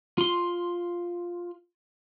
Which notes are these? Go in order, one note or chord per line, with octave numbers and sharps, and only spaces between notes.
F4 C6